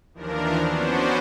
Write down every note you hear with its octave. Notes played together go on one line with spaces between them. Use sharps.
D#2 E3 F3 D4 A#4
B3 C#4 D4 F#4 C5